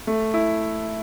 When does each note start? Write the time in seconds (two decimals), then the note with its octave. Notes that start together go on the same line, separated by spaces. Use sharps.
0.07 A3
0.34 E4